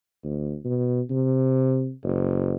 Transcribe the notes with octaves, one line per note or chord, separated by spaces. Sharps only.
D2
B2
C3
F#1